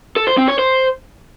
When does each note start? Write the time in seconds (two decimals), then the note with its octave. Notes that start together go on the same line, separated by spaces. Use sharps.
0.16 A4
0.27 C5
0.37 C4
0.48 C#5
0.59 C5